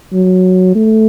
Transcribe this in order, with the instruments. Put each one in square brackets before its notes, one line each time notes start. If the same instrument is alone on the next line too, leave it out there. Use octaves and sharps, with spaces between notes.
[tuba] F#3
A3